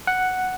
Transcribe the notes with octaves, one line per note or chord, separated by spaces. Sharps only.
F#5